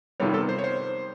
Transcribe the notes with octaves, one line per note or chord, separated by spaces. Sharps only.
F2 C3 D#3 G3 B3 C#5
A4
C5
C#5
C5